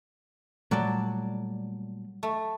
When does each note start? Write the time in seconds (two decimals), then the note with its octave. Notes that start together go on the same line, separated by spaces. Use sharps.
0.71 A#2 F#3 G3 A3 D5 A5
2.23 A3